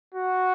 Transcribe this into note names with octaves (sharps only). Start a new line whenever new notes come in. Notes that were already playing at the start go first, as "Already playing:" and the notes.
F#4